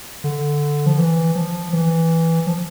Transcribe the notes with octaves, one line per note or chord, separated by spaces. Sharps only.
D3
F3
E3
F3
E3
F3